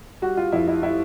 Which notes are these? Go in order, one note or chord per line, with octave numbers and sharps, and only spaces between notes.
G3 F#4
F4
F2 E4
E4
G3 E4